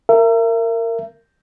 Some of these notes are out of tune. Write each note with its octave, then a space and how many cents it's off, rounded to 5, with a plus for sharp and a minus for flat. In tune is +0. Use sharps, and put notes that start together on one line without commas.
A#4 -20 E5 +35